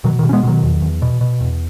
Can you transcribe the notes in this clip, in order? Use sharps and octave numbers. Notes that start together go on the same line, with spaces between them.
B2 D#3 F#3
D#3
B2
C#4
G#3 B3
B2 D#3 F#3
E2
E2
B2
B2
E2